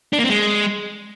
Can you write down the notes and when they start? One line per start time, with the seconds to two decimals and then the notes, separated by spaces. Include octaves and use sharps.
0.13 D4
0.18 A#3
0.24 C4
0.30 G#3